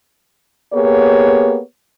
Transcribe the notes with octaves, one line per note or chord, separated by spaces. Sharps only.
A#3 B3 G4 G#4 C#5